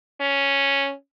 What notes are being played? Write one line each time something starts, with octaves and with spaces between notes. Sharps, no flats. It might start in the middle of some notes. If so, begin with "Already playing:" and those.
C#4